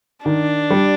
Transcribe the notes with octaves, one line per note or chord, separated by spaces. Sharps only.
D#3 D4
G3